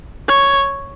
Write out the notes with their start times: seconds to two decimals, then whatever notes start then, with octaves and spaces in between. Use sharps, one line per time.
0.29 C#5